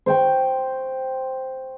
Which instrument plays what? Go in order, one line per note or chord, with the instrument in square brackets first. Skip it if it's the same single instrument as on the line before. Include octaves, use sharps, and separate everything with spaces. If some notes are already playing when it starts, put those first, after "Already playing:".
[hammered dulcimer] C5 G5 C#6